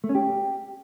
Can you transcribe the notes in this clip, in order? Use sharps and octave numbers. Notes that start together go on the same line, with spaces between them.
A3
C#4
G4